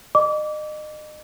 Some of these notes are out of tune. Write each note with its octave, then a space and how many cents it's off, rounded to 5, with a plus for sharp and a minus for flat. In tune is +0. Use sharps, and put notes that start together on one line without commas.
D#5 -35 D6 -25